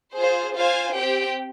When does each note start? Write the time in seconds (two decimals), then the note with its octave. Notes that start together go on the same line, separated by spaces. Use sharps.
0.16 F4 G#4 C5
0.54 F4 C5 F5 G#5
0.94 C4 G4 C5 G5